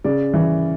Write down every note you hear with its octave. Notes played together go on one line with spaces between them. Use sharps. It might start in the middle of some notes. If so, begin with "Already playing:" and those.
C#3 D5
E3